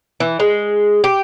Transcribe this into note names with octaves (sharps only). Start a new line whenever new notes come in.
E3
G#3
G4